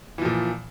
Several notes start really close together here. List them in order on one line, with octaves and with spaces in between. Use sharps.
E3 F3 A#2